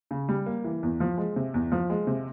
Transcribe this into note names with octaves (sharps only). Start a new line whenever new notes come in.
C#3
G3
A#3
E3
E2
F3
G#3
C3
E2
F3
G#3
C3